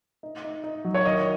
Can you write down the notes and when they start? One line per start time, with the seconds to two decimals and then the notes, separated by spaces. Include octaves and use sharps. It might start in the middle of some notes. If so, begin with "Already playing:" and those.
0.23 D#4
0.44 D#4
0.64 D#4
0.85 F#3
0.94 C#5
1.05 D#3 D#5